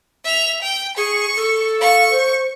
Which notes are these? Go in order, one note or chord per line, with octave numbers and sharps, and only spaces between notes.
E5 F7
G5
G#4 C#6
A4
F5 C#6
C5